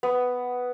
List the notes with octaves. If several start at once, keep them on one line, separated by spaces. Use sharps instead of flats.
B3